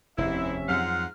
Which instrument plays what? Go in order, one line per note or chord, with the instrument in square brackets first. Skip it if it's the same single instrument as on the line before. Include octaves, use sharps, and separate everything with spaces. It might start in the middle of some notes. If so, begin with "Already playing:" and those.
[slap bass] F1 D#2 [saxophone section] G#2 E4 [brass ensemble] C3 C#4 E5
[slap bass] F2 F#3 [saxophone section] G#2 F4 F#5 [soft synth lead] F6